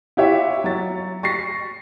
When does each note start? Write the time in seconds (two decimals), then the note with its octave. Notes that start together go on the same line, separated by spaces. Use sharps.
0.17 E4 F4 G4 C#5 E5 F#5
0.64 F#3 C#5 A6
1.23 C#6 A6 A#6 C7